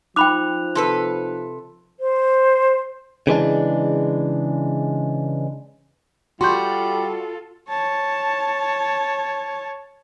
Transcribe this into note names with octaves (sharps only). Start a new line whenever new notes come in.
F3 D#4 G5 B5 D6 F#6 F7
C3 A4 B4
C5
C#3 E3 G#3 D4
G3 F4 F#4 A4 C6 C#6 G6
C#5 A5